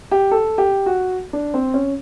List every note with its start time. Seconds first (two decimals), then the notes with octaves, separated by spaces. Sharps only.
0.11 G4
0.31 A4
0.58 G4
0.86 F#4
1.33 D4
1.54 C4
1.74 C#4